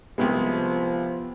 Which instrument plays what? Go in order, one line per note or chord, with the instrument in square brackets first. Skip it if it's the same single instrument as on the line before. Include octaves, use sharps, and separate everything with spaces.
[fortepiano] C2 C3 G#3 [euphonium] F3 [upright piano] B3